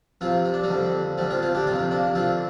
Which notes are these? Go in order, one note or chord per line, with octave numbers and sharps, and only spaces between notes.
F2 C3 C4 F4
C4
D4
G3 C4
F2 D3
D2 D3 G3 C4
C4 F4
C4 F4
D4 G4
F2 C3 C4 F4
A#3 D4
F2 D3 C4 F4